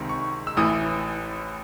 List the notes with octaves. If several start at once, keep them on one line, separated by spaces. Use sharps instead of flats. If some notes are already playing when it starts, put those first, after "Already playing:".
Already playing: C#2 C3 D#3
C#6
E6
A1 A2 E3 D#6